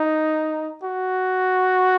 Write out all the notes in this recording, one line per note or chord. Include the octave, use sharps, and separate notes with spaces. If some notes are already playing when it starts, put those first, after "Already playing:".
Already playing: D#4
F#4